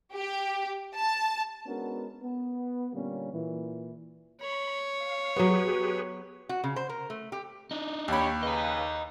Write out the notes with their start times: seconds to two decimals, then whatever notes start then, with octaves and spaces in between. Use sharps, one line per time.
0.14 G4
0.95 A5
1.66 G#3 B3 C#4 D4 F#4 A#4
2.22 B3
2.93 A#2 D3 G3 A#3 C#4
3.32 A#2 E3
4.41 C#5 B5
5.00 F5
5.36 F#3 B3 G4 G#4 B4
6.49 F#4
6.64 C#3
6.76 C5
6.89 A#4
7.10 A3
7.32 G4
7.71 D4 D#4
8.08 D#2 G4 C#5 B5
8.43 C#3 B4 D#5 A#5